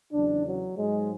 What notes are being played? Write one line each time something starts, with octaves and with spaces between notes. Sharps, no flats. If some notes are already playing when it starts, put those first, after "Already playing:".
E2 C#3 F#3 D4
F#3
G#2 F#3 G#3